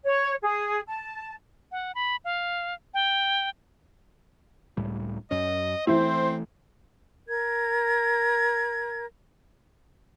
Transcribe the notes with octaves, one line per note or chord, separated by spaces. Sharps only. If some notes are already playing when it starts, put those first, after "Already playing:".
C#5
G#4
A5
F#5
B5
F5
G5
C#2 A2 G3
F#2 C#4 D#5
E3 A3 C4 E4 C5
A#4 G#6